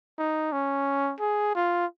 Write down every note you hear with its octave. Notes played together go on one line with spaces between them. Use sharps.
D#4
C#4
G#4
F4